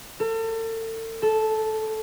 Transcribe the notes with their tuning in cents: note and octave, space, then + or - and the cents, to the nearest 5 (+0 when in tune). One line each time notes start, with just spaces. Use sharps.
A4 +40
A4 -10